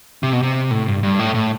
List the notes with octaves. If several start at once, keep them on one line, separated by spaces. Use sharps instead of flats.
C3
B2
C3
A2
G2
G2
A2
A2